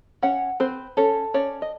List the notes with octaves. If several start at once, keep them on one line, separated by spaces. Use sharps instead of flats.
C#4 C#5 F#5
C4 B4 C5
C#4 A4 C#5
C#4 C#5 D5
D#5